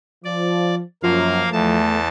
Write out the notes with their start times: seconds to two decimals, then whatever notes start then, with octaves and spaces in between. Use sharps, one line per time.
0.25 F3 D5
1.03 F#2 F3 A#3 F5
1.53 E2 A3 A5